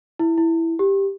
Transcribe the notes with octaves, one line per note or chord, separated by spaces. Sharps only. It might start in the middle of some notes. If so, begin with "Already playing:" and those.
E4
E4
G4